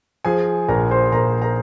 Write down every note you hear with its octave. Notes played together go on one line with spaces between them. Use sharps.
F3 G#4 G#5
A#1 A#4 A#5
C5 C6
A#1 A#4 A#5
A#4 A#5